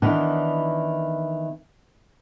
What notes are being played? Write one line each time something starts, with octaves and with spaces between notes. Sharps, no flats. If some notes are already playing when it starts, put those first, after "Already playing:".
D#3 E3 B3 D4